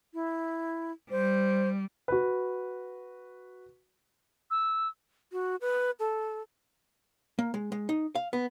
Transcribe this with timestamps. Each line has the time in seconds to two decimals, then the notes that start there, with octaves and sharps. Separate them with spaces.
0.14 E4
1.11 G3 C5
2.08 F#4 B4
4.51 E6
5.32 F#4
5.61 B4
5.99 A4
7.39 A#3
7.54 G#3
7.72 G#3
7.89 D#4
8.15 F5
8.33 B3